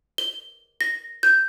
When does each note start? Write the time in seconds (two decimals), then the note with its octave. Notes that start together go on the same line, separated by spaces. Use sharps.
0.18 G7
0.81 A#6
1.23 G6